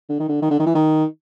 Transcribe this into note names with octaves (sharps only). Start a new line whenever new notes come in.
D3
D#3
D3
D#3
D3
D#3
E3
D#3